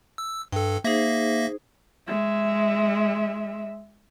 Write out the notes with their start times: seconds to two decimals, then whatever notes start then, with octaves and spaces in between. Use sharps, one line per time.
0.18 E6
0.52 G2 A4 G5
0.84 A#3 D#4 G#4 C5 E5 A#6
2.08 G#3 E5